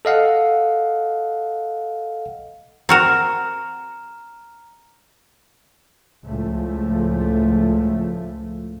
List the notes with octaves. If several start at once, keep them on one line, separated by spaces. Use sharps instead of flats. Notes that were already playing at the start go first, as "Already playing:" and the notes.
A4 D#5 F5 F#5
C4 F#4 A#4 A#5 F6 E7
C#2 A2 F3 A3